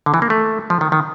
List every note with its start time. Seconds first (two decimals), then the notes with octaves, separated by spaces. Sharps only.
0.06 D3
0.14 E3
0.22 A#3
0.30 A3
0.70 F3
0.81 D#3
0.92 D#3